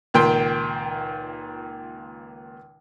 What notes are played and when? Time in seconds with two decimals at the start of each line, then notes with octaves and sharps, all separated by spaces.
0.14 C#2 A#2 D#3 G5 C6